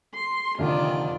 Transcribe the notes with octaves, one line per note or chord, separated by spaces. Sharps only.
C6
F1 D3 D#3 F4 D5